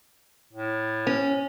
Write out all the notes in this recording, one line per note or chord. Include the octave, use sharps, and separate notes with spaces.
A2
C#4